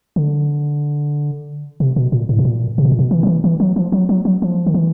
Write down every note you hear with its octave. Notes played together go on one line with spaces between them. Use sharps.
D3
C3
B2
A#2
A2
B2
A#2
C3
B2
A#2
B2
E3
F3
E3
E3
F#3
F3
F#3
F#3
F#3
F3
D#3
E3